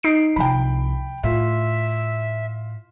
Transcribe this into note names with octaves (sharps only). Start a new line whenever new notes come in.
D#4 C7 D7
C2 F3 G5 B5
A2 F4 E5